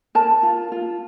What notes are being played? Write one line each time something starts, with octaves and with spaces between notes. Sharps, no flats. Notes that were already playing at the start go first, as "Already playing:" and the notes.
A#4 A5
F4
F4